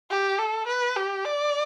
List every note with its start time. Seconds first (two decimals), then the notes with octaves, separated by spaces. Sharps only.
0.10 G4
0.39 A4
0.67 B4
0.96 G4
1.25 D5